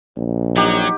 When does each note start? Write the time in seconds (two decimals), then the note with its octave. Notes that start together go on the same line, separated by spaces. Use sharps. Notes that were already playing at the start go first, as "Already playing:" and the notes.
0.17 A#1
0.57 F#3 D#4 G4 F#5